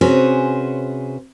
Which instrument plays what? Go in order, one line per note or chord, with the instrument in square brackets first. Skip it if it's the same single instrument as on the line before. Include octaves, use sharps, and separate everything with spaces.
[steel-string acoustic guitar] C3 C#4 F#4 G#4 B4 C5